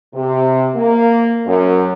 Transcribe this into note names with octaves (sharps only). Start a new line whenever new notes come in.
C3
A#3
F#2